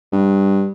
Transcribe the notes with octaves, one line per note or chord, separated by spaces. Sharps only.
G2